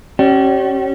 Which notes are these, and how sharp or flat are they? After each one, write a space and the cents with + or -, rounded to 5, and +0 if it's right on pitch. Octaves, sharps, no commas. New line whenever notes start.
C#4 -30 G4 -40 D5 +0